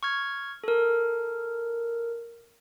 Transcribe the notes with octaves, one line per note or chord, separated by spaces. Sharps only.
C#6 F6 G#6
A4 A#4